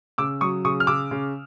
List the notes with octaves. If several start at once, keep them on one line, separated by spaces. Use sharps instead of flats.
C#3 D6 E6
F#3 C#6 D#6
C#3 C#6 D#6
F6
C#3 D6 E6
C#3